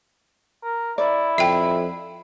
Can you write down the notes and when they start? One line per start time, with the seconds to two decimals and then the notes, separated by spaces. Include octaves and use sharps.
0.63 A#4
0.98 E4 D5
1.38 F2 E5 G5